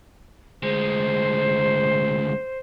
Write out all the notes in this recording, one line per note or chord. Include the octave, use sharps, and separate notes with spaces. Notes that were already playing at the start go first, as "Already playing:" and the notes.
D2 G#3 C5